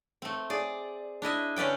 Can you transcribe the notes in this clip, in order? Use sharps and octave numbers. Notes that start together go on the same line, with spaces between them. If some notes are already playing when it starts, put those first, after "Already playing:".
A3 C4
G#4 D5
D4 E4 D#5 E5
D3 C#4 B4 D5 G5